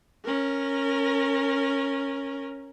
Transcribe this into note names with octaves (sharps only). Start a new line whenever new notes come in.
C#4 A#4